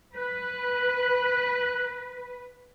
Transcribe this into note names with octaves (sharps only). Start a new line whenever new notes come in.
B4 F#6